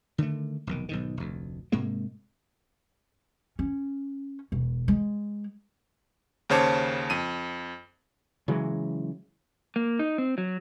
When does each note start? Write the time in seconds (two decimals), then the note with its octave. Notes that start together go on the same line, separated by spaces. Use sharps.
0.18 D3 D#3 G#3 A3
0.67 F1 B1 D#3
0.89 B1 G#2 D#3
1.17 F1 D2
1.72 G#2 C3 G#3 A#3
3.59 C#4
4.52 E1
4.88 G#3
6.49 D#2 C#3 C5 C#5 A5 D6
7.10 F2 D#7
8.48 C#3 E3 F#3 G#3
9.76 A#3
9.99 D#4
10.18 C4
10.38 F#3